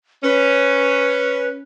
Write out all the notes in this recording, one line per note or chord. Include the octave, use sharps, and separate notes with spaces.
C#4 B4